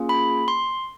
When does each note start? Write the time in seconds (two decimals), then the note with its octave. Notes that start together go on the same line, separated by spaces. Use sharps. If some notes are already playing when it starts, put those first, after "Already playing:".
Already playing: A#3 C#4 F4 G#4
0.09 B5
0.48 C6